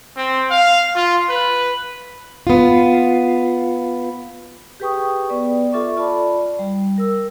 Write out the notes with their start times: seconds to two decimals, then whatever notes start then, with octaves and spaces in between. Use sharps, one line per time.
0.17 C4
0.51 F5
0.96 F4
1.29 B4
2.47 B3 F4
4.80 G4 G#4 B4 G5 C#6 D#6
5.29 B3 B4 D5
5.73 F4 A4 E5 C#6 D6
5.97 F4 D5 A5 B5
6.59 G3
6.98 A#4 E6